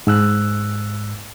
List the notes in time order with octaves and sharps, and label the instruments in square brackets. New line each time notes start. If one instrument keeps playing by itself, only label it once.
[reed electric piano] G#2 E6 F#6